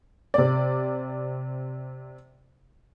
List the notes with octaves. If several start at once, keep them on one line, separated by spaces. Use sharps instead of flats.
C3 D5